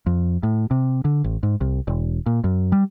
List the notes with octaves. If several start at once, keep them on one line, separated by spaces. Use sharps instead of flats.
F2
A2
C3
D3
A1
G#2
C2
E1
A#2
F#2
G3